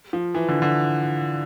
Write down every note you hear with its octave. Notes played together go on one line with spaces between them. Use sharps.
F3
E3
D3
D3